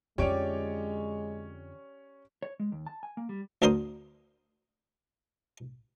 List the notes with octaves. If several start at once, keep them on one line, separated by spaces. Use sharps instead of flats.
F2 D3 G#3 C#4 G4 C#5 D5 D7
C#5
G#3
D#2
A5
G#5
A#3
G3
D2 D3 A#4 C5 C6 D#6